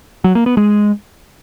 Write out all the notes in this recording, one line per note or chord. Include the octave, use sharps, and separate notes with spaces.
F#3
A#3
B3
G#3